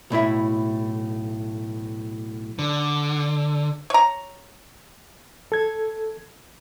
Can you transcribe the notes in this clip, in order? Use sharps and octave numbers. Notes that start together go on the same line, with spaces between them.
B1 A2 E4 E5
D3
C#5 A#5
A4 G#6